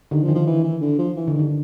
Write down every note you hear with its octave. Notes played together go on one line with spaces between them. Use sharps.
D3 D#3
F3
D#3
F3
E3
E3
D3
F3
E3
D3
D#3
D3